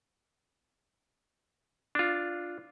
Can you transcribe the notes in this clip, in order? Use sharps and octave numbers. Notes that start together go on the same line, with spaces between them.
D4 F4